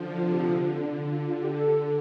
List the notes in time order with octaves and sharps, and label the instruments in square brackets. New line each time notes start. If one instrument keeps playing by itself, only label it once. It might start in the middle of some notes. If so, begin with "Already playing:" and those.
Already playing: [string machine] D3 F3
[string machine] C3 [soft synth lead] F4
[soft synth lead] G4
[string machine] D3 [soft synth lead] F4
[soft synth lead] D4
F4
F4
G4
A4